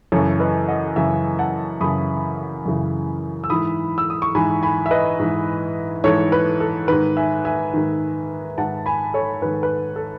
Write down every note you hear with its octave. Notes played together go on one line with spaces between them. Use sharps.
F#2 C#3 E3 A4 C#5
B4 D#5
D#5 F#5
F#2 C#3 E3 E5 G#5
F#5 A5
F#2 C#3 E3 B5 D#6
F#2 C#3 E3
E6
G#2 E3 B5 D#6
E6
D#6
C#6
G#2 E3 G#5 B5
G#5 B5
E5
B4 D#5
G#2 E3
G#2 E3 A4 C#5
B4
A4
G#2 D#3 B4
E5 G#5
E5 G#5
G#2 D#3
G#2 D#3 F#5 A5
G#5 B5
A4 C#5
G#2 D#3 B4
B4
A4